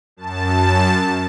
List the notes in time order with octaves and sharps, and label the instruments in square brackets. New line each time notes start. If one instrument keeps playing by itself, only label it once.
[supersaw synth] F#2 A5